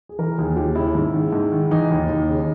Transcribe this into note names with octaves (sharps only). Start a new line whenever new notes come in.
G#4
E3 A#4
D#2 G#4
D#2 G4
C#3 E4
G#2
D#3
G#2
D#3
E3 D#4
D#2
D#2
C#3